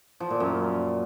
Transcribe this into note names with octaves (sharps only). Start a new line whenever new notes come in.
F3
A#2
F#2